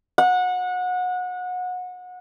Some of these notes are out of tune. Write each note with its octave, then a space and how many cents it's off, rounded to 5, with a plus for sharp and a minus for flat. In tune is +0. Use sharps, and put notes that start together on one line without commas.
F#5 -25